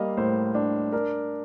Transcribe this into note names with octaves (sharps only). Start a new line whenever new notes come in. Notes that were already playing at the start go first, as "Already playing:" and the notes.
Already playing: G3 A#3 D#5 F5
A2 C5
D4
D4 A#4